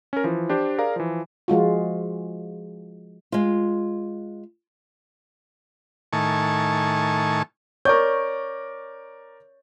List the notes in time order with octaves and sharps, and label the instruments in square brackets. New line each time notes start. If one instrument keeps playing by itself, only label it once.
[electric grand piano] C#4 A#4
E3 F3
D4 G4 C5
G#4 A#4 D5 F5 A#5
E3 F3
[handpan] F3 G#3 F4 F#4
[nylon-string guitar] G#3 F4
[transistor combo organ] A2 D#3 G#5 A5 C#6
[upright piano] A#4 D5 G6 [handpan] C#5